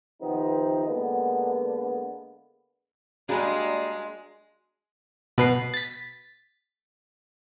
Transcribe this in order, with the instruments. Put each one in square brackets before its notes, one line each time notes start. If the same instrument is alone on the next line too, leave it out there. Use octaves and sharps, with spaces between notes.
[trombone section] C3 D#3 F3 B3 C4 D#4
D3 G#3 A#3 B3
[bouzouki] G3 A#3 [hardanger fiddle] G#3 [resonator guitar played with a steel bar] D4 G#4 [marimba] F#4 A#5 B5
[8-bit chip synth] B2 B4 C7
A6 B6